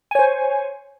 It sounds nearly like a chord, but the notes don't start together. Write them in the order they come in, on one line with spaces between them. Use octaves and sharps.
G#5 C#5 C5